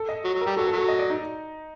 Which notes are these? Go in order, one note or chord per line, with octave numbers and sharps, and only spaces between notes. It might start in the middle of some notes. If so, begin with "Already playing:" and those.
Already playing: A4
D#5
F#3
F#3
A#4
G3
F#3 A4
A4
F#3
A4
D#5
D5
D#4